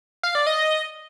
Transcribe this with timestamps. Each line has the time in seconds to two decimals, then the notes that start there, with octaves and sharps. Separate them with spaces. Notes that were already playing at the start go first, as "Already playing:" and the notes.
0.23 F5
0.35 D5
0.47 D#5